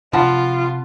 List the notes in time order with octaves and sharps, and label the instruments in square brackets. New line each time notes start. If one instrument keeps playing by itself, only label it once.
[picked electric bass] C3 [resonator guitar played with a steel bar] F3 [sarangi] F4 [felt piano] F#5 A5 B5